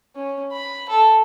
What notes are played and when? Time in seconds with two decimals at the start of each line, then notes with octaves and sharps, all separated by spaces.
0.15 C#4
0.53 B5
0.89 A4